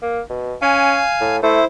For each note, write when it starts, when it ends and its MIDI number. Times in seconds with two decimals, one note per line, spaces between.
0.02 0.21 58
0.30 0.55 47
0.62 1.03 61
0.62 1.36 77
0.62 1.36 80
1.21 1.39 45
1.43 1.61 57
1.43 1.65 64
1.43 1.65 72